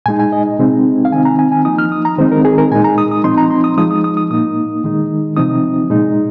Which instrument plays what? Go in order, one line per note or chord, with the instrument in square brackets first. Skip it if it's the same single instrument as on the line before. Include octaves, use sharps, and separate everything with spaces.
[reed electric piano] A#2 G#3 D#4 G#5
G#5
D#5
C3 G#3 C4 D#4
F5
D#3 C4 D#4 G#5
A#5
G#5
G#5
F3 A#3 D#4 D#6
F6
D#6
A#5
D#3 G#3 C4 D#4 C5
A#4
G#4
A#4
A#2 G#3 D#4 G#5
A#5
D#6
D#6
F3 C4 D#4 C6
A#5
C6
D#6
F3 G#3 D#4 D#6
D#6
D#6
D#6
A#2 A#3 D#4 D#6
D#3 G#3 D#4
C3 F3 C4 D#4 D#6
A#2 G#3 D#4